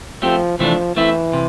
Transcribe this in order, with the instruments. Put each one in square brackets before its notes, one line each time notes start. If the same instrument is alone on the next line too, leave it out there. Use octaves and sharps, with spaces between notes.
[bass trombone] F3 [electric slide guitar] A3 C4 G4
[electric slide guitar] C3 E3 A3 D4 [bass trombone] F3
[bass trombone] E3 [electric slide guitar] A3 C4 E4
[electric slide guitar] C3